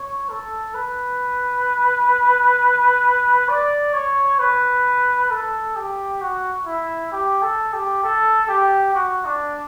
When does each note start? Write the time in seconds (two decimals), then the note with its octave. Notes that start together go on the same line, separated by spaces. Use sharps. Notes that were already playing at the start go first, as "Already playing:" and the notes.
Already playing: C#5
0.29 A4
0.74 B4
3.49 D5
3.93 C#5
4.39 B4
5.31 A4
5.76 G4
6.21 F#4
6.66 E4
7.12 G4
7.42 A4
7.73 G4
8.03 A4
8.48 G4
8.94 F#4
9.25 D4